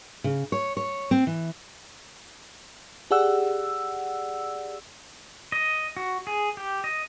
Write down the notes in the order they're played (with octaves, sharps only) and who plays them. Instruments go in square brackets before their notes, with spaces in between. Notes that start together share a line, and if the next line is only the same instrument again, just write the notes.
[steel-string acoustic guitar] C#3
C#5
C#5
C4
E3
[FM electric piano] G4 G#4 D5 F#5 E6
[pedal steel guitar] D#5
F#4
G#4
G4
D#5